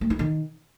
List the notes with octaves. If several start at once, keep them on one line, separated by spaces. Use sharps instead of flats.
A3
E4
D#3